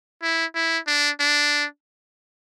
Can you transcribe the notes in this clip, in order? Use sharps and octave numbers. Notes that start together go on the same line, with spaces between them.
E4
E4
D4
D4